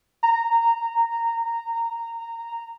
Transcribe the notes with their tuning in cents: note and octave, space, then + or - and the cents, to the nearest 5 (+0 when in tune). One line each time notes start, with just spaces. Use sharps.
A#5 -15